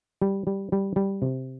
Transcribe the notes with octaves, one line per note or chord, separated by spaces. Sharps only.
G3
G3
G3
G3
C3